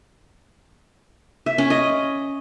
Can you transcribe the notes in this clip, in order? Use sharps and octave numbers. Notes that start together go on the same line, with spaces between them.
E5
C#4
D#5